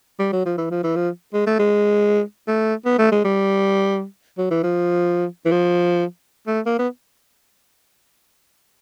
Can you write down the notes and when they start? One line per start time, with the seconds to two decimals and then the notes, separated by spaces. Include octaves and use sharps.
0.19 G3
0.32 F#3
0.45 F3
0.58 E3
0.71 F3
0.84 E3
0.96 F3
1.34 G#3
1.46 A3
1.59 G#3
2.48 A3
2.86 B3
2.98 A3
3.11 G#3
3.24 G3
4.38 F#3
4.50 E3
4.63 F3
5.45 E3
5.52 F3
6.47 A3
6.66 A#3
6.79 B3